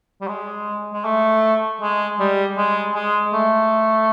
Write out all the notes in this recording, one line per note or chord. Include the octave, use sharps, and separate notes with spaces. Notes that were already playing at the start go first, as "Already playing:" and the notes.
G3
G#3
G#3
A3
G#3
G3
G#3
G#3
A3